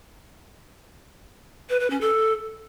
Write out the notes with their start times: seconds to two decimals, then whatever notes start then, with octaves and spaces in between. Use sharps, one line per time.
1.69 B4
1.80 B4
1.90 C#4
2.01 A4